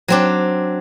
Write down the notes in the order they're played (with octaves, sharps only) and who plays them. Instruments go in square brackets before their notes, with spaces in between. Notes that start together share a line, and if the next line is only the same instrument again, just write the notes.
[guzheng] F#3 C4 D4